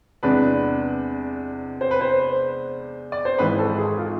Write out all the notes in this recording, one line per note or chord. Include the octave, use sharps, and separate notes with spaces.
E2 C3 G#3 D4 B4
C5
B4
C5
D5
C5
G#1 G#2 E3 B4
A4
G#4
F4